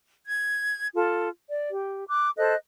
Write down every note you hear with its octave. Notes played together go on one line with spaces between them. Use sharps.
G#6
F4 A4
D5
G4
D6 F#6
A4 C5 D#5 F#6